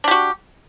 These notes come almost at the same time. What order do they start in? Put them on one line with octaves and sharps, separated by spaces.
D4 G4 F#4